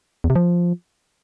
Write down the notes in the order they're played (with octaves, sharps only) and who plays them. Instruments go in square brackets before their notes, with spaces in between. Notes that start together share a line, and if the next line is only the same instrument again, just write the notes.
[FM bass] E2
C3
F3